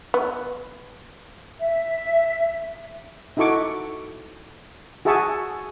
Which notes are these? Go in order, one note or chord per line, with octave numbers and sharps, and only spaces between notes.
B3
E5
D#4 E4 F#4 A4 C#6 D6
F#4 G#4 E5 A5 C#6